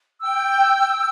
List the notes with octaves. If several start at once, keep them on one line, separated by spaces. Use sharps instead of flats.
G5 E6